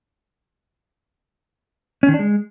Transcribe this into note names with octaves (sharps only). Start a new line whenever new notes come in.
C#4
D#3
D4
G#3